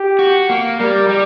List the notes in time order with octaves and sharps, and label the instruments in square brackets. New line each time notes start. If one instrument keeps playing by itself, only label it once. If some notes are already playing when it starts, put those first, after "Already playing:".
Already playing: [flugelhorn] G4
[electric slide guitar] F#4
A#3
[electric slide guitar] G3 [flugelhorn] A#4
[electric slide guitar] G3